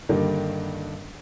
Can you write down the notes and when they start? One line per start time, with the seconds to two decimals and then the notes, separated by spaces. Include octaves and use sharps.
0.09 G2 D3 D#3 G3 A#3 D#4